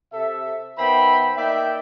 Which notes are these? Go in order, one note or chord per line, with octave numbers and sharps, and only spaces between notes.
C3 A4 E5
D#3 B3 C5 E5 G5 B5
A#3 D#4 D5 E5 G5